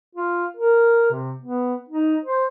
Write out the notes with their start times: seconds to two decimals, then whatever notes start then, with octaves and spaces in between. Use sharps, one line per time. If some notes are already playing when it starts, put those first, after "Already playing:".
0.15 F4
0.57 A#4
1.11 C3
1.42 B3
1.89 D#4
2.25 C5